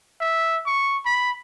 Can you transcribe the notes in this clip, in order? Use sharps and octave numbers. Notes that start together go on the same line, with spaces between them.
E5
C#6
B5